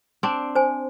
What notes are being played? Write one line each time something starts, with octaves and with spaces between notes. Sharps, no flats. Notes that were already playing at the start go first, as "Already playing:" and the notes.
C4 D4
C5 G#5